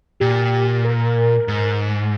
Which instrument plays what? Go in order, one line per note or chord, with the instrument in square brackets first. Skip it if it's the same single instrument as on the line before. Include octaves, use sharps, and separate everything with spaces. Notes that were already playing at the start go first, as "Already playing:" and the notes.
[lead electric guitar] A#2 [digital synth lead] G4
[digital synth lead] A#4
[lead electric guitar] G#2